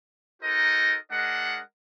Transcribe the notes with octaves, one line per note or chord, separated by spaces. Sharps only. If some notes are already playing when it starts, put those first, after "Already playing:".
D#4 F#4 A4 A#4 C5 D#5
G#3 D4 A#4 D#5 F#5